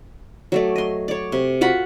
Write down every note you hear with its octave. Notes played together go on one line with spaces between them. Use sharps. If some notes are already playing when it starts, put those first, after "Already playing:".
F#3 A3 D5
D#5 C6
C#5 D5
C3
F4 F#4 F#5 B5